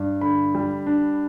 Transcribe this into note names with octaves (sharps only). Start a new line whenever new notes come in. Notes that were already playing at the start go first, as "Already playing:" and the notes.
Already playing: G2
D3 B5
G3
D4